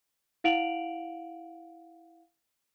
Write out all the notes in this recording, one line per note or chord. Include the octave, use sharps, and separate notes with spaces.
E4 F5 F#5 D7 F7 F#7